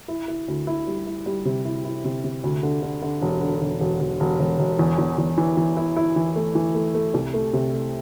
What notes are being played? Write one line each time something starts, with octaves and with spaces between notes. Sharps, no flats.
E4
E4
D2
E4
G3
E4
G3
C3
E4
E4
C3
C3
D2
D3
D3
D3
E1
D3
E1
E1
E1
E1
E1
E1
E2
E2
E2
E3
E3
E4
E4
E3
A3
E3
A3
A3
C2
A3
C3
A3